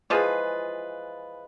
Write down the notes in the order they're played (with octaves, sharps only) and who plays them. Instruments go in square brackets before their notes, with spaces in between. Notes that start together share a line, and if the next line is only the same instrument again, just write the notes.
[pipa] E3 F3 G#3 [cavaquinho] F4 G#4 B4